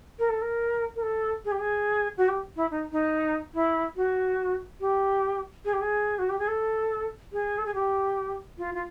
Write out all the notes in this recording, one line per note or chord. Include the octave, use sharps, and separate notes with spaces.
A#4
A4
A#4
A#4
A4
G#4
G4
G#4
F#4
G4
E4
D#4
D#4
E4
F#4
G4
G#4
G4
G#4
F#4
G4
G#4
A4
G#4
A4
G#4
G4
F4
F4